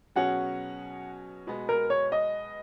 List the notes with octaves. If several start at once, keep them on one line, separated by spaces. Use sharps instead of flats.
B2 F#3 C#4 G#4 F#5
B2 G#3 B3
A#4
C#5
D#5